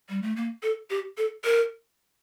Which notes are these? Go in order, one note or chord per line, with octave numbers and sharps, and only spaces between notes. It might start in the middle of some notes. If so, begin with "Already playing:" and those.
G3
A3
A#3
A4
G4
A4
A#4